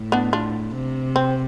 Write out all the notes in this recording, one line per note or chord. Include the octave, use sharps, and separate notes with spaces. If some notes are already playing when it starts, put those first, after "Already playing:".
Already playing: A2
B3 D4
D4 F4
C3
C4